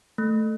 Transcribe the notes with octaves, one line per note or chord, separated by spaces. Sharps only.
A3